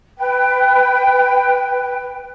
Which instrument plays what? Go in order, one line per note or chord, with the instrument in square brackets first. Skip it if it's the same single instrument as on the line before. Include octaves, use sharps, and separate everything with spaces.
[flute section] B4 G5